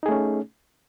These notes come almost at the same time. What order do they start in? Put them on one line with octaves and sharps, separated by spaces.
D#4 G#4 A3 C#4